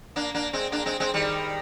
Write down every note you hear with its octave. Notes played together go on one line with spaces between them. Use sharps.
A#3 D4
A#3 D4
G#3 C4
A#3 D4
G#3 C4
G#3 C4
D#3 G3